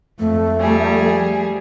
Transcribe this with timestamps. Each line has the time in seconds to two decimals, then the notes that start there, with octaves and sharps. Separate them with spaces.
0.19 F2 A3
0.61 F3 G3 G#4